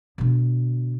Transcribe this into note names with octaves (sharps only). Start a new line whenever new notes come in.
B2 D3